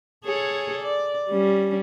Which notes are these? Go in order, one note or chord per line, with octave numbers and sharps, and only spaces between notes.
G#4 A4 C#5
D5
G3 C#4